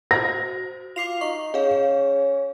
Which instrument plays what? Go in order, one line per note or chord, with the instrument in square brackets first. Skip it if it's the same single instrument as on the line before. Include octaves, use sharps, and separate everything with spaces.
[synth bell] F#4 C5 [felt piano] A#6
[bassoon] F4 [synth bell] D6 C7 F7
[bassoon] D#4 [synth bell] C#6
[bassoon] C#4 [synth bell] G#4 F5